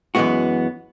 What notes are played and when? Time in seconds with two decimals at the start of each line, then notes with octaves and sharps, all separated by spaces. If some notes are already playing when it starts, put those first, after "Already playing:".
0.15 F#2 E3 F3 G#3 B3 F#4